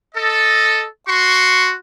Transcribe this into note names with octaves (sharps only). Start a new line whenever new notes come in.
A4 D#5
F#4 C6 C#6